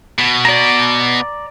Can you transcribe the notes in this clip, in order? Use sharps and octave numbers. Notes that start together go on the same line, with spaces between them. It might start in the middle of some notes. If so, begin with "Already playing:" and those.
B2
D5 A#5